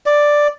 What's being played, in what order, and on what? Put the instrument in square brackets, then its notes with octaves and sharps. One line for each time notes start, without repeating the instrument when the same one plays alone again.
[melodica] D5